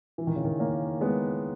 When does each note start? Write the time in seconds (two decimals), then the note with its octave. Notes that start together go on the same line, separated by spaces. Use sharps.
0.18 E3
0.27 D#3
0.36 C#3
0.44 D#3
0.60 A#3 C#4
1.01 G#3 B3